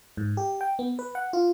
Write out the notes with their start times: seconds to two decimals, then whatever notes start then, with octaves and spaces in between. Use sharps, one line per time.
0.17 G#2
0.37 G4
0.61 G5
0.79 B3
0.99 B4
1.15 F#5
1.33 F4